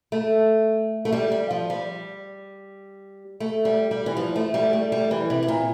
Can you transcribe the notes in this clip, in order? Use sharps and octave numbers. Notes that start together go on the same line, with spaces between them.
A3
A3
G3
G3
F3
G3
A3
G3
G3
E3
F3
A3
G3
A3
G3
E3
C3
C3
A#2